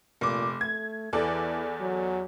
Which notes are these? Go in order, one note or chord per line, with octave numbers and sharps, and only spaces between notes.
F1 A#2 D6
A3 G#6
E2 E3 A4 D5
F#3